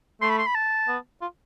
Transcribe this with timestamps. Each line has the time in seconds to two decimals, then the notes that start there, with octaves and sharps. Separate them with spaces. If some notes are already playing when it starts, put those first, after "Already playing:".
0.22 A3 C6
0.30 B5
0.38 C6
0.47 B5
0.55 A5
0.88 B3
1.21 F4